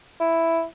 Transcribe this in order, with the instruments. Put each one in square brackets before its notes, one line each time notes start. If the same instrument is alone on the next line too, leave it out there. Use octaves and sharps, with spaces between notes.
[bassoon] E4